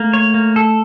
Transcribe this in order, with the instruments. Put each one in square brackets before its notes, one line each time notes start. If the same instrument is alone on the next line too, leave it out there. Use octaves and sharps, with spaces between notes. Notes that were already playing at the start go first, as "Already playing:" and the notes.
Already playing: [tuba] A3 [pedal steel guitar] A#3
[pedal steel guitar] C#5
A#3
A4